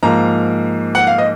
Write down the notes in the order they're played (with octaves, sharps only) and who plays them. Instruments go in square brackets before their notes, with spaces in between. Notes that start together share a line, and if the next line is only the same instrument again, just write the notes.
[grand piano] G#2 F3 A#3 [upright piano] A#5
[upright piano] F#5
F5
D#5